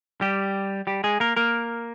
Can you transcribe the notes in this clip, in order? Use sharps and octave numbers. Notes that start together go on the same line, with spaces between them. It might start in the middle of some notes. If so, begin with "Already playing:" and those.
G3 G4
G3 G4
G#3 G#4
A#3 A#4
A#3 A#4